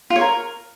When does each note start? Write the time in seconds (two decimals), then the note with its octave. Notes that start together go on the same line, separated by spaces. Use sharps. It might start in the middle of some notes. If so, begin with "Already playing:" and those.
0.10 F4
0.16 C#5
0.21 A#4